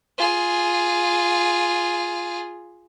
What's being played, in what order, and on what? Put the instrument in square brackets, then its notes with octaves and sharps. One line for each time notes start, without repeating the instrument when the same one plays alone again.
[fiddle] F4 G#4